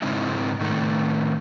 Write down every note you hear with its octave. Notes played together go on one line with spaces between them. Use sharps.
G#2 C#3 G#3 C4 D#4 E4
A2 D#3 A3